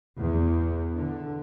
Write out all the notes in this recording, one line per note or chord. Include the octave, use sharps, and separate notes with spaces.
E2
D3